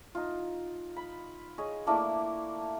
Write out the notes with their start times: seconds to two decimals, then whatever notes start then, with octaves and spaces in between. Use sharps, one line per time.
0.15 D#4 F4
0.97 B5
1.58 G#4 C#5 D#5
1.87 A3 A#3 D4 E4